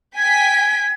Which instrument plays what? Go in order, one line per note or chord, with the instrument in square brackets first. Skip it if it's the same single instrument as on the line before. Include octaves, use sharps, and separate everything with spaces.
[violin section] G5 G#5 B6 [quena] G#6